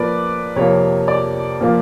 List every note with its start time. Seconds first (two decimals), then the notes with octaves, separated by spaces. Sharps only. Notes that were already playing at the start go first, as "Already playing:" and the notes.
Already playing: A#2 F3 A#3 B4 D5
0.56 F2 C3 F3 A#3 C#5
1.08 D5
1.61 A#2 F3 A#3